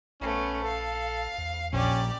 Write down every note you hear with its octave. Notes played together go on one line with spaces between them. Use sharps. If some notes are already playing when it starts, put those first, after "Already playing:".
A#1 A3 B3 C#4
A4 F5
E2
A#1 C#4 G4 D5